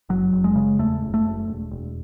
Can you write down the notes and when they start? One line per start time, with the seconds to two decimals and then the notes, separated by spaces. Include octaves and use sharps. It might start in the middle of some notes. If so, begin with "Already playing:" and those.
0.09 F#1 F#3
0.33 F#1
0.44 G#3
0.56 C#3
0.79 E2 A3
1.02 F#1
1.14 A3
1.25 F#1
1.48 E1
1.72 E1